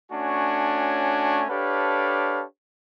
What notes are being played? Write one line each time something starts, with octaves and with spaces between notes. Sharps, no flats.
A3 C#4 D4 F#4 C#5 G#5
D4 G4 A4 B4 C#5 F5